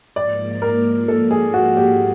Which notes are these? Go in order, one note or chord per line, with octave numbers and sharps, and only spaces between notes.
G#2 F3 A#3 D5
A#4
A4
G#4
F#4
G4